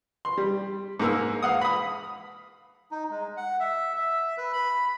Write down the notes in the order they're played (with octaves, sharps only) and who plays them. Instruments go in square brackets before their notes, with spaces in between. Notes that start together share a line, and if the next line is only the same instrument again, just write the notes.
[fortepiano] C6
G3
G#2 A#3 E6
F5 F#5 D#6
B5 D#6
[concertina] D#4
G#3
F#5
E5
E5
B4
B5